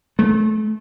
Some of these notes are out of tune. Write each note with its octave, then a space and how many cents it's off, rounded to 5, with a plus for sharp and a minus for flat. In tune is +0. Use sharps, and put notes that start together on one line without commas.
A3 -30